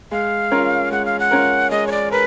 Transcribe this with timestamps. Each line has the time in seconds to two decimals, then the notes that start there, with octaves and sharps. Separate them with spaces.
0.11 G#3 F5
0.52 C#4 F4 A#4
0.91 G#3 F#5
1.05 F5
1.19 F#5
1.31 C#4 F4 A#4
1.71 G#3 D#5
1.87 C#5
1.91 D5
2.11 A#4 B4